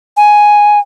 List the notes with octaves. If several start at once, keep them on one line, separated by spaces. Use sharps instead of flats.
G#5